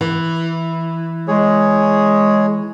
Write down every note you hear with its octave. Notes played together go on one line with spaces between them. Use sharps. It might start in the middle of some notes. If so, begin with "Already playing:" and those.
E3
G#3 G#4 C#5